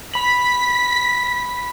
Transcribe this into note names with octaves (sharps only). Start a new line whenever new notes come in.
B5 B6 F#7